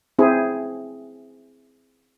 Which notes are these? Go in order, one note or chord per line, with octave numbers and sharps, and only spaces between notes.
C4 E4 G#4